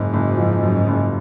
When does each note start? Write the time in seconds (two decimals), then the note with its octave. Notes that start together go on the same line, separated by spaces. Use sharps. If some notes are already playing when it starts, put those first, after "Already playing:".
Already playing: F#1 G#2
0.14 F#1
0.37 F3
0.63 F#2
0.87 F#1